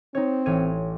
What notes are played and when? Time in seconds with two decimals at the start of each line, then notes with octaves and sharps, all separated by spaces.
0.15 C4 D#4 C#5
0.46 A1 C#5 D#7